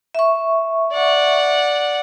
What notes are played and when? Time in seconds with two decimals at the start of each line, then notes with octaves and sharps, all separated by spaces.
0.15 E5 C#6
0.93 D5 F#5